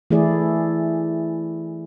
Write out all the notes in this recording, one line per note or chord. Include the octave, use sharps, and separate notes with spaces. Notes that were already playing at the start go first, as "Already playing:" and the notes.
E3 A3 E4 G#4 D5